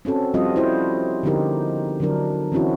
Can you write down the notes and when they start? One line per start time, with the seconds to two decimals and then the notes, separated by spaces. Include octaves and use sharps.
0.05 C4 C#4 F#4 A4
0.34 F3 G3 C4 F4 F#4 D#5
0.56 E4 F#4 C5
1.23 D3 F3 B3 D#4 G4 A#4
2.00 D3 F#3 D4 A#4
2.52 E3 C4 C#4 E4 F#4